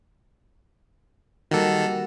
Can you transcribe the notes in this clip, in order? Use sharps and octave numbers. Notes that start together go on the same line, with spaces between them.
D#3 G3 A#3 F#4 A4